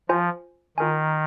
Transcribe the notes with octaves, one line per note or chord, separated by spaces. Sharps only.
F3 F4 C5 G#5
D#3 F4 A#4 G#5